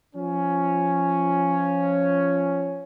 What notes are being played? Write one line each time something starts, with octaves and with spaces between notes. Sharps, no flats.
F3 C#4